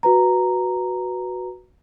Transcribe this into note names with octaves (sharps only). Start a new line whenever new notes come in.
F#4 B4 A#5